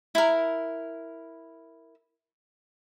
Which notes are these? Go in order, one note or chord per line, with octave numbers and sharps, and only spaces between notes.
E4 A#4